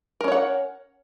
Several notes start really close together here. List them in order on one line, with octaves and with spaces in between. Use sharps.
A#4 C#4 C#5 F#5